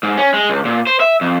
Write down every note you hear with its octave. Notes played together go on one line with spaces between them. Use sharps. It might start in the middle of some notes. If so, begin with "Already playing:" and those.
G#2
C#4
G#3
C#2
A#2
C5
E5
F2